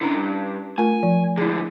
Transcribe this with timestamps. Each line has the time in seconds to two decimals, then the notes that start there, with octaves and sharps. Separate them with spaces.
0.01 D3 C#4 D4 E4 A#4
0.15 G2
0.78 A3 F4 A#4 G#5
1.03 F3
1.38 G#2 D3 E4 G#4